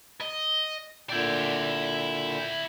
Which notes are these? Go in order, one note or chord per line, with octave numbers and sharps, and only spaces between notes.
D#5
A#2 D3 E4 D5 G5